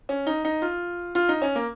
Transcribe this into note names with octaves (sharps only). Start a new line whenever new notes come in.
C#4
D#4
D#4
F4
F4
D#4
C#4
A#3